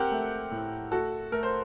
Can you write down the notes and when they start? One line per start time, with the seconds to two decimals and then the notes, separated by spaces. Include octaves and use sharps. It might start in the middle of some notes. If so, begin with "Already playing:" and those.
Already playing: C4 G4 A#4 F#5
0.12 A3
0.51 A2
0.91 A3 F#4 A4
1.32 A3 A#4
1.43 C5